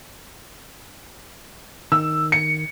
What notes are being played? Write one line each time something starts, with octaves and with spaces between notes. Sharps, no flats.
D#3 E6
C#7